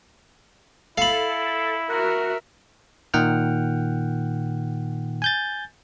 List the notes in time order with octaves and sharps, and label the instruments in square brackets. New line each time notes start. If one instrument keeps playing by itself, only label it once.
[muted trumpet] E4 [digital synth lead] A4 [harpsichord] F5 B5
[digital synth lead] F#4 [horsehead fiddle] A#4 E5
[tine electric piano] A#2 D#3 F#5 G5 F6
G#5 G6 A6